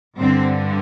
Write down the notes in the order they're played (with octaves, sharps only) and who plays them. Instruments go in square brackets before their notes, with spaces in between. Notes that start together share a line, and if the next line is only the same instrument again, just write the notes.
[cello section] G2 D3 C4